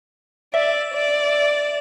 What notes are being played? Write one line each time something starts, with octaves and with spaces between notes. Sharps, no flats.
D5 E5
D5